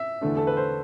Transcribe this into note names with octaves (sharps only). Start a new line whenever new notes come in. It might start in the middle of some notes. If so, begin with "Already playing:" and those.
Already playing: E5
E2 D3 A3 D4
A4
B4
C5